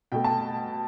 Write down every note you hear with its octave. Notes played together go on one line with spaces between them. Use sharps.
B2 A3 G5
A5